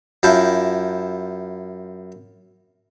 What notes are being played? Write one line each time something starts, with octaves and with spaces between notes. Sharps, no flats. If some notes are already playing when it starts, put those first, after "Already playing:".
F#2 E4 F4 G5 A5